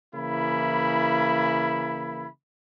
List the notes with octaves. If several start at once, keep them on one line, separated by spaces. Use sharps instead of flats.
C#3 E3 A#3 E4 B5